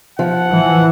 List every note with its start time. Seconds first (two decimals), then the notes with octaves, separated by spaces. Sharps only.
0.19 F3 F#5
0.53 E3